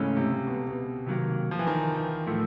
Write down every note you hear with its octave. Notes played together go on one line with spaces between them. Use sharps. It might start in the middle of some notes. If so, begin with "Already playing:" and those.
Already playing: G#2 C#3 E3 A3 C#4
C3
B2
B2
C3 D#3 F#3 A#3
F3
E3
D#3
E3
A2 F3 A3